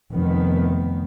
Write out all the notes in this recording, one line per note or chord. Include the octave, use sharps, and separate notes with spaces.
F1 D#3 B3